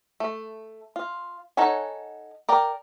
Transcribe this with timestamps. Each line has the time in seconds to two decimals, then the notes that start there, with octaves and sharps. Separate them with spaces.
0.20 A3
0.96 F4
1.57 D#4 A4 C#5 F#5 G#5
2.49 A#4 D5 G5